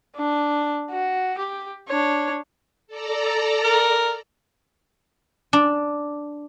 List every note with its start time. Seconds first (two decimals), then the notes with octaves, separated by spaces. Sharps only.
0.16 D4
0.90 F#4
1.38 G4
1.88 D4 C#5
2.87 A4 D5 A#5
3.64 A#4
5.53 D4